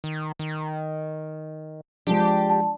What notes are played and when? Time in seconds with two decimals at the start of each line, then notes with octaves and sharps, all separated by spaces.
0.04 D#3
0.39 D#3
2.07 F3 G#3 D4 G4
2.50 A5